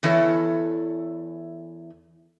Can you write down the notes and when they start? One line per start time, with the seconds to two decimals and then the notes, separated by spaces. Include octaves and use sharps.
0.03 E2 E3 E4 A4 C#5